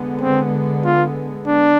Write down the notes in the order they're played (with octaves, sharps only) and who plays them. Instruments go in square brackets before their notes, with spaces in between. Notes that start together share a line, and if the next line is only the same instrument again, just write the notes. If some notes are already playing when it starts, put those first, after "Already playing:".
Already playing: [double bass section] D3 G#3 B3
[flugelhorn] C4
F4
D4